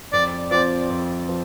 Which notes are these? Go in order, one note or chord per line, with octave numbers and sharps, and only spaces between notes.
F2 D5
F3 C4 D5
F2
F3